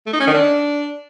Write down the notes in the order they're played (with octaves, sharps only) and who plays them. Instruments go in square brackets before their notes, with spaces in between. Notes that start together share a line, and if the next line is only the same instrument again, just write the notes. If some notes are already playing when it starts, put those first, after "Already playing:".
[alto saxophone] A3
D#4
C#4
D#3
D4